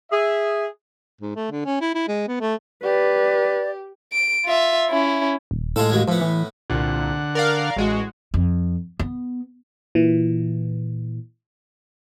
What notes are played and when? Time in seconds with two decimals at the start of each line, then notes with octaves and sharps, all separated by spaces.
0.12 G#4 E5
1.21 G#2
1.36 A3
1.51 D3
1.65 C#4
1.81 E4
1.95 E4
2.08 G#3
2.28 B3
2.41 A3
2.83 G4 B4 D5
4.12 D7
4.45 F4 E5
4.90 C#4 E4
5.51 D#1
5.76 A2 G#3 F4 A4
5.90 D#2 F#3 G#3
6.08 A2 F3 B3
6.21 E3
6.70 C2 A#2 D3 F#5
7.35 A#4 D5 F5
7.76 A1 G#3 F#4
8.34 F2
8.99 B3
9.95 A#2 E3